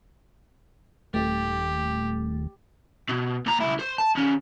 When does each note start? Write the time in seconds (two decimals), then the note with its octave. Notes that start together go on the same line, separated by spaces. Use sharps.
1.14 D#1 A3 G4
3.09 B2
3.46 A#2 A#5
3.61 C#2 E4
3.79 C5
3.98 A5
4.15 D#3 C#4